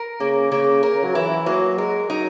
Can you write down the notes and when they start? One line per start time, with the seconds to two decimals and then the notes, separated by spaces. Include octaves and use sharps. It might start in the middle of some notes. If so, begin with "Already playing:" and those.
Already playing: A#4
0.20 C#3 A#3
0.52 C#3 A#3
0.83 C#3 A#4
1.04 F#3
1.15 E3 E4
1.46 F#3 A#3
1.78 G#3 A#4
2.08 F#3 D#4